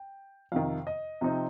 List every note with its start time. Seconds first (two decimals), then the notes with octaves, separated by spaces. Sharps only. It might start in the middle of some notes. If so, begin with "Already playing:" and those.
Already playing: G5
0.52 F2 C3 D#3 F5
0.87 D#5
1.21 C3 F3 C4 D#4